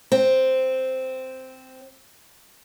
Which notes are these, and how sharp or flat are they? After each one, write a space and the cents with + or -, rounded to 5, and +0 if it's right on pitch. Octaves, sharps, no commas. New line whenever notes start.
C4 -5